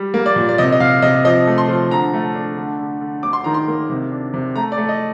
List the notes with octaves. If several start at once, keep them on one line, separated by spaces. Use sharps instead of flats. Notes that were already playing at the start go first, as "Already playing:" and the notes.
Already playing: G3
A#3
D5
A#2
D5
C3 D#5
D#5
C3 F5
C3 D#5
F3 D#5
A3
C6
F3
D3 A#5
A3
D4
D3
D3
D3
D2 D6
C6
D#3 A#5
C6
A#3
C3
D4
C3
A3 A#5
D5
A3
D#5